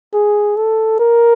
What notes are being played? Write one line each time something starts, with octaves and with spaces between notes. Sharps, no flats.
G#4
A4
A#4